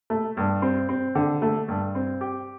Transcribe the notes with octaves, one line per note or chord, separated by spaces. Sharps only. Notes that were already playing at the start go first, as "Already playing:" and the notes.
A3
G2
C4
C4
D3
A3
G2
C4
G4